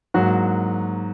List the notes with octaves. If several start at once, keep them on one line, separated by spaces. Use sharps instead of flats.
G#2 F#3 A#3 F#4